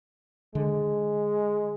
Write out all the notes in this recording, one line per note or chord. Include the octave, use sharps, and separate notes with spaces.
D3 G#3